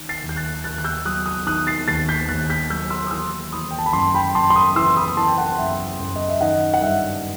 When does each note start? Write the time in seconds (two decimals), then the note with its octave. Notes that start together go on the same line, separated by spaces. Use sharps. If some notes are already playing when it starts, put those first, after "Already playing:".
Already playing: D#3
0.09 A6 C7
0.23 D#2
0.29 G6
0.36 F#6 A6
0.64 D#2 F#6 A6
0.78 F#6
0.84 E6 G6
1.05 F#3 D#6 F#6
1.26 D#6 F#6
1.46 D#3 D#6 F#6
1.67 A6 C7
1.88 D#2 A6 C7
2.09 G6 B6
2.28 D#2 F#6 A6
2.50 G6 B6
2.70 F#3 E6 G6
2.90 C6 E6
3.07 D#6
3.11 E3 C6 E6
3.52 E3 B5 D#6
3.71 G5
3.78 A5
3.86 B5
3.93 F#2 A5 C6
4.14 G5 B5
4.35 F#2 A5 C6
4.50 C6
4.56 B5 D#6
4.76 E3 C6 E6
4.97 B5 D#6
5.17 E3 A5 C6
5.28 G5
5.38 F#5 A5
5.58 F#2 E5 G5
6.00 F#2
6.16 D#5
6.29 E5
6.41 D#3 D#5 F#5
6.74 F#5
6.82 G2 E5